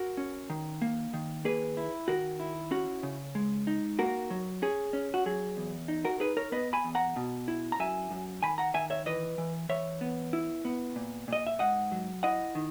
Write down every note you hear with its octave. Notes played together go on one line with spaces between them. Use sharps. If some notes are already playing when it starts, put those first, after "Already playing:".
Already playing: F#4 A#4
C#4
D#3
A#3
D#3
A#3 G#4 B4
E4
D#3 F#4 A#4
E4
C#4 F#4
C#3
G#3
D#4
A#3 F#4 A#4
F#3
C#4 G#4
C#4
F#4
F#3 G#4
E2
D#4
F#4 A#4
D#4 G#4 B4
A#4 C#5
B3 B4 D#5
G#5 B5
E2
F#5 A#5
B2
E4
A#5
F#2 E5 G#5
F#2
D#3 G#5 B5
F#5 A#5
D#3 E5 G#5
C#5 E5
E3 B4 D#5
E3
E3 C#5 E5
B3
E4
B3
A#2
A#2 D#5
E5
G#2 D#5 F#5
F#3
E4 D#5 F#5
D#3